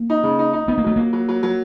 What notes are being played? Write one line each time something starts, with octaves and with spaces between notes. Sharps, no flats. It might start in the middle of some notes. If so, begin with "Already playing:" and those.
Already playing: A#3
D#4
C#3
D#4
D#4
B3 D#4
A#3
F#3 A3
F#3 A#3
F#3
F#3
F#3